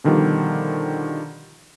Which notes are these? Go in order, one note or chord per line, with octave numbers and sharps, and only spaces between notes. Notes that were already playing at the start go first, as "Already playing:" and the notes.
B2 D3 D#3 F3 G3